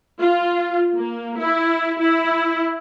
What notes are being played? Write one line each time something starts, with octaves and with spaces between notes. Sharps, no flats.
F4
A#3
E4
E4